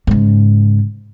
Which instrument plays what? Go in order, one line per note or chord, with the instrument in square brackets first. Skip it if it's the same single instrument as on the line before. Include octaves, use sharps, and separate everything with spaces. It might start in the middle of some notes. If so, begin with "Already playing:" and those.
[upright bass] G#2 C#3